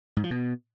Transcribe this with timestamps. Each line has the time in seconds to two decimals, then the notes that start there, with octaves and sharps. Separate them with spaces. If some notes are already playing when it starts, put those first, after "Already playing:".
0.17 G#2
0.24 F3
0.31 B2